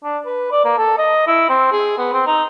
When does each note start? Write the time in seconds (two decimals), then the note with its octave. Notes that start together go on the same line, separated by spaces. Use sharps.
0.04 D4
0.26 B4
0.52 D5
0.65 A#3
0.78 A4
0.98 D#5
1.27 E4
1.49 C4
1.72 G#4
1.98 B3
2.13 C4
2.27 D#4